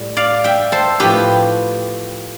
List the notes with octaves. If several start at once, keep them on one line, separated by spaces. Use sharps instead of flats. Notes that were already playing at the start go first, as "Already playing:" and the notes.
Already playing: A2 G3
D5 F5
E5 G5
A4 C5
A2 F3 B3 G4 B4